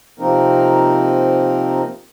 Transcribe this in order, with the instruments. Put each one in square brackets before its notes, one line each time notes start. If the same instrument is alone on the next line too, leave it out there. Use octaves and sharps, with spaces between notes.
[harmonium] C3 F3 A#3 C4 D#4 A#4